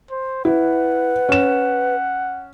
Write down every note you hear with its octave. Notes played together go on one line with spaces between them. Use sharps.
C5
E4 B4 F#5
C#4 E7